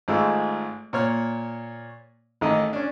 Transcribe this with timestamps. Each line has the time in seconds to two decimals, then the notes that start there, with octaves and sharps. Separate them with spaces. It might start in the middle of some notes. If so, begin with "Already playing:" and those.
0.08 G#1 G#2 A3 F4 E6
0.93 A#2 C#5 F6
2.41 A1 D#3 A4 D#5
2.73 C#4 D4